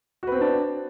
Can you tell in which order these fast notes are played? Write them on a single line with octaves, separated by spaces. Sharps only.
F#4 B4 C4 B3 D4